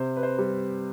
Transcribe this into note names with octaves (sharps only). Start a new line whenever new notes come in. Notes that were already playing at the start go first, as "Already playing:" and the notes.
Already playing: C3 C5
B4
C5
G3